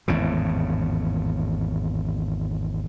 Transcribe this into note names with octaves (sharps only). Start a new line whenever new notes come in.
G#1 E2 A2 C#3